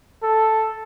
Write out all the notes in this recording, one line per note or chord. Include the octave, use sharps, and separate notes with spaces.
A4